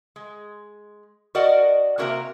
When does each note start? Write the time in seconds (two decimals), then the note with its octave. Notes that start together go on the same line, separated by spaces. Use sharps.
0.16 G#3
1.35 F#4 A#4 D5 D#5 F#5
1.98 C3 A#3 F#4 A#4 E5 A#5